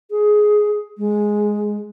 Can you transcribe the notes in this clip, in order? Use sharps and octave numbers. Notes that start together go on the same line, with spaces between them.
G#4
G#3